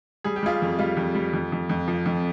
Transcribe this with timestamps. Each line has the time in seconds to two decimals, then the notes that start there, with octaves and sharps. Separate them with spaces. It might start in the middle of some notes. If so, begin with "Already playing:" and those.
0.24 G3 G#4
0.36 G4
0.43 G3 F4 G#4
0.62 F2
0.79 G3 F4
0.97 F2
1.15 G3
1.33 F2
1.52 F2
1.69 F2
1.88 F3
2.06 F2